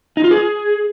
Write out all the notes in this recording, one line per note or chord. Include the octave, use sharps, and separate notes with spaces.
D#4
F4
G#4